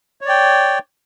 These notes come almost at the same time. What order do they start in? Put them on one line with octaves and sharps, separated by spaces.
C#5 D5 G5